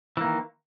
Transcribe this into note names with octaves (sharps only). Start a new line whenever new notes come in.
D#3 E3 A#3